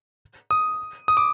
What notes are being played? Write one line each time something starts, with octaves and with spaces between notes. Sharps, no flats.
D#6
D#6
D6